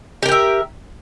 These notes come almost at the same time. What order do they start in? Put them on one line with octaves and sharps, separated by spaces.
G4 A#4 G5 E5